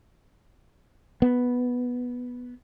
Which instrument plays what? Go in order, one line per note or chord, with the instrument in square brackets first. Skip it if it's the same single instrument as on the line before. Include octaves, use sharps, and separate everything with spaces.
[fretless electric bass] B3